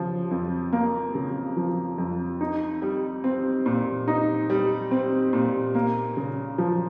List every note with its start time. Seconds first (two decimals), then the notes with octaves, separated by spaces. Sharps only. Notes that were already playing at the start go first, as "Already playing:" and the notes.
Already playing: C#3 F3
0.31 F2
0.73 A#3
1.15 C#3
1.57 F3
1.98 F2
2.41 D#4
2.82 G3
3.24 C4
3.66 A#2
4.08 D#4
4.50 G3
4.91 C4
5.33 A#2
5.75 A#3
6.17 C#3
6.58 F3